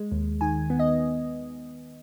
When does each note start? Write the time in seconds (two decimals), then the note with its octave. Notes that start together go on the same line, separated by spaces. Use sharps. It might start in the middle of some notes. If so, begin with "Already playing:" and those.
Already playing: G#3
0.12 D#2
0.41 D#3 G#5
0.70 B3
0.79 D#5